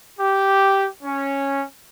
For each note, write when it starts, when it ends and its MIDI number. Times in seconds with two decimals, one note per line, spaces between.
0.18 0.87 67
1.03 1.61 61